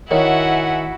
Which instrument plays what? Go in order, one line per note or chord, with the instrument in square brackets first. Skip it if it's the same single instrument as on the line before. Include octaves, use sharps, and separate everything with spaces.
[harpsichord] D#3 [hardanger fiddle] E4 F#4 [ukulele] C#5 [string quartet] E5 F#5 G#5